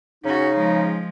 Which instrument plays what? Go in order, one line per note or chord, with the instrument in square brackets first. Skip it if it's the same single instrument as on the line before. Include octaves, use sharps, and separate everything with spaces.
[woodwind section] C#3 D#4 [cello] C#4 F#4
[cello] F3 G#3